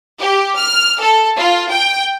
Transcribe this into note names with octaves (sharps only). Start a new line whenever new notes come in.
G4
F6
A4
F4
G5